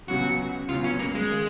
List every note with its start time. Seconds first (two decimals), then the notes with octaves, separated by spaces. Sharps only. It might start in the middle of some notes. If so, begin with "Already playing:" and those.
0.08 C#2 C#3 F#3 B3 F#4
0.69 C#2 C#3 F#3 B3 F4
0.84 C#4
0.99 A#3
1.15 G#3
1.30 D#3 A#3